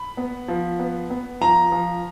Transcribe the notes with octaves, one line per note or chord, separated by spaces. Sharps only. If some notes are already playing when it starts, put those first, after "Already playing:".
Already playing: B5
B3
F3
B3
B3
F3 A#5
F3